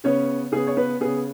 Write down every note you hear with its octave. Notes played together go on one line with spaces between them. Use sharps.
C#3 B3 C#4 C#5
C#3 B3 G#4
C#5
B3 B4
C#3 B3 G#4